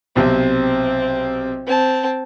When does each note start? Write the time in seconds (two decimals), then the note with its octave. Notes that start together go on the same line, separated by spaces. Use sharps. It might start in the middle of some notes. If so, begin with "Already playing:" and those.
0.16 B1 C3 C4
1.67 C4 A5